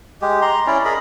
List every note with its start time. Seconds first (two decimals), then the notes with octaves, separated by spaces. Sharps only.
0.22 G#3 G4
0.42 A#5 C6
0.67 C#4 E4 D5
0.85 G#4 A#4 D#5 B5